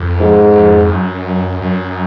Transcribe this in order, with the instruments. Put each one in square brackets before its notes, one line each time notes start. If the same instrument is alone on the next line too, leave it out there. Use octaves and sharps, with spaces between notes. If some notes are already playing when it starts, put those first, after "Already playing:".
Already playing: [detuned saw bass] F2
[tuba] G#2
[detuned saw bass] F#2
F#2